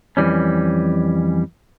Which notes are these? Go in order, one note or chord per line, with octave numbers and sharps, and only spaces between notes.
F2 E3 G3 C#4